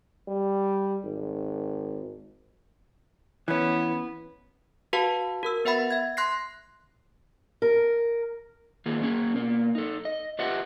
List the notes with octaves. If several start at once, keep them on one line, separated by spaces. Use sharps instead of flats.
G3
G#1
E3 B3 C#4
F#4 B4 F5 A5
F#4 A#4 E6
B3 B4 E5 F#5 B5 A6
E5 G#6
C6 F#6 A#6 C7
A#4
D#3 A#3 F4 G#4
A#3 C#4 G#4
B2 A#3
D#4 A4
D#5
F4 G4 B4 D#5 E5 F#5